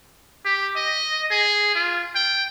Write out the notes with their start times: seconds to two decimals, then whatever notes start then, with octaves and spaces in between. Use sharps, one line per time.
0.45 G4
0.76 D#5
1.31 G#4
1.75 F4
2.16 G5